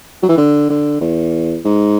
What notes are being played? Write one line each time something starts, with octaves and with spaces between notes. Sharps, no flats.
F#3
E3
D3
D3
E2
G#2